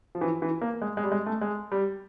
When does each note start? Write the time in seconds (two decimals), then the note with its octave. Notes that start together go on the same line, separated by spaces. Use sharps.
0.15 F3
0.21 E3
0.42 E3
0.61 A#3
0.82 G#3
0.97 G#3
1.04 G3
1.12 G#3
1.26 A3
1.41 G#3
1.72 G3